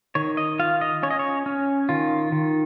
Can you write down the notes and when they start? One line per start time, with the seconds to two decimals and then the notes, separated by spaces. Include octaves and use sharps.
0.15 D#3 C#5
0.37 D#5
0.59 F4 F5
0.81 D#5
1.03 C#4 C#5
1.11 D#5
1.19 C#5
1.46 C#4
1.89 D#3 F4
2.32 D#3